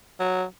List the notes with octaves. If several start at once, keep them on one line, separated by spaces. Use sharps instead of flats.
F#3